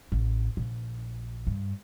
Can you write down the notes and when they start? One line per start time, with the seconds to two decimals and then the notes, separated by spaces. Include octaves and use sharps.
0.12 A1
0.57 A#1
1.47 G2